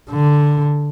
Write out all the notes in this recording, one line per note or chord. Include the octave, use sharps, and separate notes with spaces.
D3